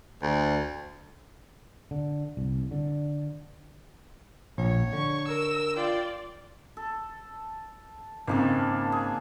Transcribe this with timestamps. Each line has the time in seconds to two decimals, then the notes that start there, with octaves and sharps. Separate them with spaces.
0.22 D2
1.91 D3
2.37 C2
2.71 D3
4.58 A#1 C#5
4.93 D3 C#6
5.27 A#4 E6
5.77 F4 D5 G5
6.77 A4
8.27 G#1 C#3 A#3 D4 A4
8.92 G#4